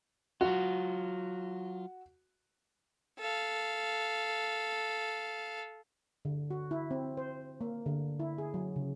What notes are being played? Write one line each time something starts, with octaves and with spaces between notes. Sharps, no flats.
F#3 F4 F#4
A4 F5
D3
F#4
E4
C4
C5
A#3
D3
E4
G#4
F#3
C#3